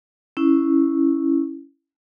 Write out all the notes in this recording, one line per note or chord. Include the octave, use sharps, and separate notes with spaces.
C#4 E4